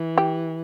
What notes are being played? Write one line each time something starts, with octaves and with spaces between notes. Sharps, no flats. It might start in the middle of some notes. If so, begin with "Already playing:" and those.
Already playing: E3
G4